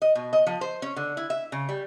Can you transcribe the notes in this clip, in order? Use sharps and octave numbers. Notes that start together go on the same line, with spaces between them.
D#5
B2
D#5
F3
C5
C#4
D3
E4
E5
C#3
G3